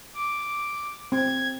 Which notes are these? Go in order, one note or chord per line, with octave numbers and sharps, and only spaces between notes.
D6
C4 G#6